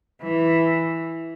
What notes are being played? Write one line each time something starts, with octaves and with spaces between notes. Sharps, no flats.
E3